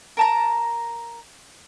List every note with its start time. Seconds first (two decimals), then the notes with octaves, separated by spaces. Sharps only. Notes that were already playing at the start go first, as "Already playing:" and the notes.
0.17 A#4 A5 A#5